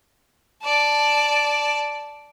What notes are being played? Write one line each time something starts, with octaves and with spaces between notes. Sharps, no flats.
D5 A5